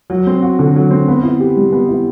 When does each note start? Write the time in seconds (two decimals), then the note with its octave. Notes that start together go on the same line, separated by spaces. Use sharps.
0.10 F#3
0.27 C4
0.43 F#4
0.59 D3
0.76 F#3
0.91 C4
1.08 B3
1.23 E4
1.40 G4
1.57 G3
1.72 B3
1.89 E4